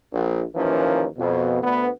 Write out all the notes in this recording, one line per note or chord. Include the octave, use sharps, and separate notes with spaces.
A#1
D#2 E3 F3 C#4 A#4
F2 B2
D2 B3